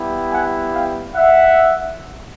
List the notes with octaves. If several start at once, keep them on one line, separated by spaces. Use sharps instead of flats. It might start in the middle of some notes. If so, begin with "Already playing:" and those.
Already playing: G3 B3 E4 G4
F#5 G#5
F5 G5
E5 F#5